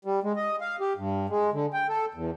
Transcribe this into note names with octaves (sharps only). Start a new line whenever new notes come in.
G3
G#3
D#5
F5
G4
G2
G#3
D3
G5
A4
E2